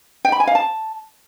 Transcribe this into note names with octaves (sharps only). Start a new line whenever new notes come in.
G5
B5
G#5
F5
A5